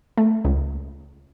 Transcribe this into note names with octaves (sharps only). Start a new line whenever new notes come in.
A3
C#2